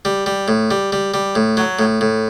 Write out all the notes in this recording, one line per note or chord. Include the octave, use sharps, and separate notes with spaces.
G3
G3
A2
G3
G3
G3
A2
F#3
A2
A2